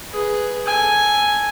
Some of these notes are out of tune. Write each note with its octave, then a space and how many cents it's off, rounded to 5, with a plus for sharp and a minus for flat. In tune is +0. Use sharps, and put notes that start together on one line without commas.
G#4 +0 B4 +0
A4 +0 G#5 +0